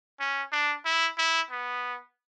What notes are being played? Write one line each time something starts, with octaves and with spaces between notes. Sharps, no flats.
C#4
D4
E4
E4
B3